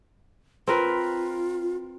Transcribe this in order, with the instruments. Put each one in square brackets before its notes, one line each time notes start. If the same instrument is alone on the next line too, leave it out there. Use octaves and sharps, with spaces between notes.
[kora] C4 A#4 B4 [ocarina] F4